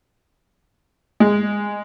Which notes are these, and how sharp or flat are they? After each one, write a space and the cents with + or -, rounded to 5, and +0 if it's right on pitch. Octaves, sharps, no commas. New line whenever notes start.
G#3 -15